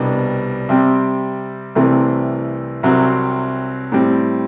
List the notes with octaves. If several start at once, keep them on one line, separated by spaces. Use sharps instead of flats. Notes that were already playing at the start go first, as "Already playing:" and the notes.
Already playing: C2 B2 G3 B3 D4
C3 G3 C4
C2 C3 E3 A3 C4
C2 C3 F#3 C4
A2 G3 C4